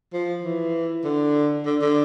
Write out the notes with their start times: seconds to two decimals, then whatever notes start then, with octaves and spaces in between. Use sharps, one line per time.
0.13 F3
0.44 E3
1.04 D3
1.66 D3
1.82 D3